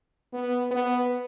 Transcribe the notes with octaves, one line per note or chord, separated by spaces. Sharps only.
B3
B3